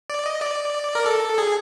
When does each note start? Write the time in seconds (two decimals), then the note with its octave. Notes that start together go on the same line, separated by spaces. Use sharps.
0.10 D5
0.26 D#5
0.41 D5
0.95 A#4
1.06 A4
1.38 G#4